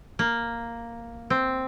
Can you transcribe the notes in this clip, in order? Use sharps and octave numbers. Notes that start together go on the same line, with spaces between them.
A#3
C4